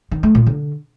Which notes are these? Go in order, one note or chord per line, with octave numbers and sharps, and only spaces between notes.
D#3
A3
A#2
D3